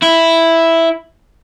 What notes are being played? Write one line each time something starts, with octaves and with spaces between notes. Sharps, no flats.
E4